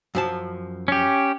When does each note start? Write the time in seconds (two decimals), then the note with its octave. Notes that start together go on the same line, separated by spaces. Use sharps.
0.15 F#2 F3 A5
0.88 C#4 G4